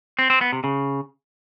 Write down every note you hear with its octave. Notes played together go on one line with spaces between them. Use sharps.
C4
C4
B3
C3
C#3